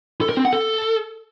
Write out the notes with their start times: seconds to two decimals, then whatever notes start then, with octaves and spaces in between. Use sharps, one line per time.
0.21 A4
0.29 A#4
0.37 C4
0.45 F#5
0.53 A4